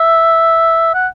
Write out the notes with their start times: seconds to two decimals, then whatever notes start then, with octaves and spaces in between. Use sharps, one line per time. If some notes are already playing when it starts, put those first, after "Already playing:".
Already playing: E5
0.94 F#5